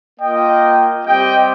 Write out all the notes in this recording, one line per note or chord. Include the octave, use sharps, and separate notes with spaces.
A#3 F4 D#5 G5
G3 C4 G4 D#5 G5